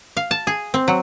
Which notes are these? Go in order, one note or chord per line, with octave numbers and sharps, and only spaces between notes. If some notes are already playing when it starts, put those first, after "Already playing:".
F5
A5
G#4
C4
F#3